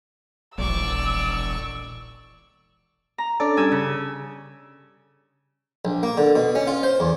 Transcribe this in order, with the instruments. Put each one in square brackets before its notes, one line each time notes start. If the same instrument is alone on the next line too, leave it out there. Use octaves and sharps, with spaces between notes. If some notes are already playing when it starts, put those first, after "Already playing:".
[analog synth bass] E1 [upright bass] A#1 [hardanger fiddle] D5 C#6 [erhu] E6
[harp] A#5
[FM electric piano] C#4 D4 A4 [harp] D5
[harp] G2 G#5 E6
C#3
[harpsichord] A#1
A#3
D3
B2
C#4
F4
C5
E2